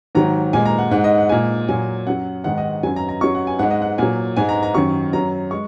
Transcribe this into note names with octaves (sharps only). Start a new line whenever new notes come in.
G#2 D#3 F#3 A#5
A#2 G#3 G#5
A#5
F#5
G#2 G#3 F#5
D#5
F#5
A#2 G#3 G#5
A#2 F#3 G#5
F#2 F#3 F#5
G#2 D#3 G#3 F#5
D#5
F#2 F#3 G#5
A#5
A#5
F#2 F#3 C#6
F#5
G#5
G#2 G#3 F#5
D#5
F#5
A#2 F#3 G#5
G#2 G#3 G#5
A#5
A#5
F#2 D#3 F#3 C#6
F#2 F#3 A#5
G#3 C#6